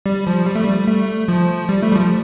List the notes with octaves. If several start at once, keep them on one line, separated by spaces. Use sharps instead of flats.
G3
F3
G3
A3
G3
A3
F3
G3
A3
G3
F3